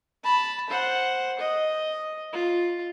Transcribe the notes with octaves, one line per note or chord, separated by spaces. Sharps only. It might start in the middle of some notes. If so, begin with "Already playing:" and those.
A5 B5
C5 F#5
D#5
F4